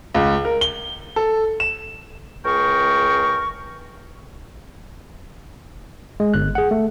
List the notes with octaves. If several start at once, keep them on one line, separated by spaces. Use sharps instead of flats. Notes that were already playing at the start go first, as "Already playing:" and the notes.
C#2
A#4
G7
A4
E7
C#2 G#4 A#4 G5 C#6
G#3
G1 F#6
G#4 F#5
A3